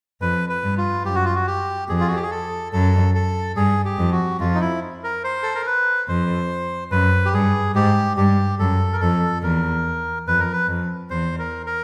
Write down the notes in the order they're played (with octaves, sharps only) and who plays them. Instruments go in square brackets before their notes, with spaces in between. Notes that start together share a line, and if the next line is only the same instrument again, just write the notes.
[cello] F2 [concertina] B4
[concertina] B4
[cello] G2
[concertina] F4
[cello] F#2 [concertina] G4
[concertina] F#4
F4
F#4
G4
[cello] F2 [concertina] G#4
[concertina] F4
F#4
G4
G#4
A4
[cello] F#2 [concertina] A4
[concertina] A4
[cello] G2 [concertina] G#4
[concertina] G4
[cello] F2
[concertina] F#4
[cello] F2 [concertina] F4
[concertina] D#4
E4
A#4
C5
A4
A#4
B4
[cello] F2 [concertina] C5
[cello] F#2 [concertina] B4
[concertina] G4
[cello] G2 [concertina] G#4
[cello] G#2 [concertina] G4
[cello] G2 [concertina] G4
[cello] F#2 [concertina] A4
[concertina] A#4
[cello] F2 [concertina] A4
[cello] E2 [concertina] A#4
[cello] F2 [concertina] B4
[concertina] A#4
B4
[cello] F2
[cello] E2 [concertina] C5
[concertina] A#4
A#4